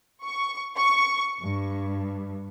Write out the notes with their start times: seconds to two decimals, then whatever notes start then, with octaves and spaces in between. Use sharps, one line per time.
0.24 C#6
0.78 C#6
1.42 G2